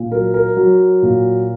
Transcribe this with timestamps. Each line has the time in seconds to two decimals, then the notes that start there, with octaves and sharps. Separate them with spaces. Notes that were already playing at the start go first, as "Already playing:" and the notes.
Already playing: A#2
0.12 F#3 A#4
0.34 A#4
0.57 F#3
1.03 A#2